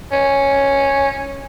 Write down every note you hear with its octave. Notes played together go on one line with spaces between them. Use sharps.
C#4